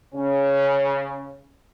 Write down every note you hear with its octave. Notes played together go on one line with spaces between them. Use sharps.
C#3 C#4